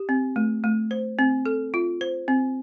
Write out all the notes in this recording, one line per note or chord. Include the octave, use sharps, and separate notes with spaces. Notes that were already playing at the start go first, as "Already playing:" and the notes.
Already playing: G4
C4
A3
A3
C5
C4
A4
F4
C5
C4